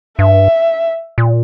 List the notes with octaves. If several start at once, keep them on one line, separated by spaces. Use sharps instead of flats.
G2 E5
A#2